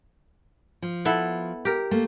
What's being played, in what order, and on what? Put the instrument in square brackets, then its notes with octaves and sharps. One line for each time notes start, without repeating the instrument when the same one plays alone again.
[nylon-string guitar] F3
[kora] B3 E4 A4
G4 A#4
[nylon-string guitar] A3 A#3